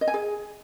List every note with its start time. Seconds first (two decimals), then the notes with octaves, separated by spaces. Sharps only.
0.01 D#5
0.08 G#5
0.14 G#4